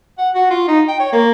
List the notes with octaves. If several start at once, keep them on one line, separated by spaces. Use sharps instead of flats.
F#5
F#4
F4
D#4
G5
C#5
A#3